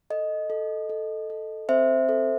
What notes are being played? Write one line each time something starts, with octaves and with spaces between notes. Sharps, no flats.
A4 D#5
A4
A4
A4
C4 C5 E5
A4